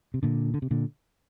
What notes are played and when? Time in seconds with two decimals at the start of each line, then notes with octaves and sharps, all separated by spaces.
0.14 C3
0.23 A#2 D3
0.54 D3
0.62 C3
0.71 A#2 D3